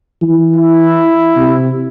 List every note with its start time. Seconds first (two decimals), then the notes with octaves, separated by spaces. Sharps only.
0.22 E3
0.56 E4
1.37 C3